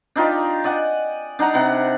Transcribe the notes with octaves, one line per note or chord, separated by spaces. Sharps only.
D4 D#4 F4 G4
D5 D#5 F#5 G#5
D4 D#4 F#5 A#5
C3 F#5 B5